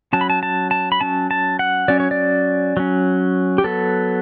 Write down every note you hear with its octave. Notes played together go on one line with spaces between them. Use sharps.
F#3 C#4 A5
B5
A5
A5
A5
B5
F#3 C#4 A5
A5
F#5
F#3 C#4 D5
C#5
D5
F#3 C#4
G4
F#3 B3 A4